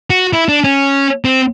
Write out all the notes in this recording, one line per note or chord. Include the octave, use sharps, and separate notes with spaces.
F#4
E4
D4
C#4
C4